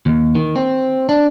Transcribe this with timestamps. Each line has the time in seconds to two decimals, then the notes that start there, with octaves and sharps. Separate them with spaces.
0.06 D#2
0.35 D#3
0.56 C4
1.09 D4